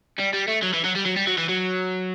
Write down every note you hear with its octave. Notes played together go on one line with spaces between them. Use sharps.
G3
G3
A3
F#3
E3
F#3
G3
F#3
G3
F#3
E3
F#3